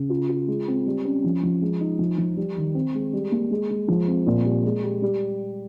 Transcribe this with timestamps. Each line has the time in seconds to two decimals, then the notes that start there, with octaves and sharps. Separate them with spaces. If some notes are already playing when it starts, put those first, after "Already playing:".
Already playing: C#3
0.09 F4
0.29 F4
0.47 G#3
0.67 C4
0.86 G3
1.05 C#4
1.24 F3
1.43 F3
1.62 G#3
1.80 D#4
1.99 F3
2.18 F3
2.36 G3
2.57 D#3
2.74 C4
2.94 G#3
3.13 G3
3.32 A#3
3.51 G#3
3.70 G#3
3.88 F3
4.07 C4
4.26 A#2
4.45 G3
4.64 G#3
4.83 G4
5.02 G3